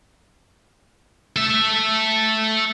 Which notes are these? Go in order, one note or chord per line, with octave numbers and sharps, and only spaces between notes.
A4 E5